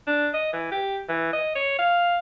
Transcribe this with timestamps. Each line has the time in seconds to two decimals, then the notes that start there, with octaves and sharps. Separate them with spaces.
0.07 D4
0.34 D#5
0.53 E3
0.72 G4
1.09 E3
1.33 D#5
1.55 C#5
1.79 F5